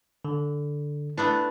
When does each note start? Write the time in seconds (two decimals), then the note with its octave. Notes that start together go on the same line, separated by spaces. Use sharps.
0.25 D3
1.18 A3 B3 D4 E4